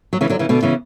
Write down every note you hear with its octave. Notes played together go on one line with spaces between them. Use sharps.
F#3
C#3 E3
D3 F#3
C#3 E3
B2 D3
C#3 E3